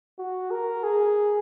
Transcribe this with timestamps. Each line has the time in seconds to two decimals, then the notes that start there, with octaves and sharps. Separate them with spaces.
0.19 F#4
0.51 A#4
0.84 G#4